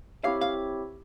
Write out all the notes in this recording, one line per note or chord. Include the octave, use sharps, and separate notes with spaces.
C4 E4 G4 C#5 E5 F5
F5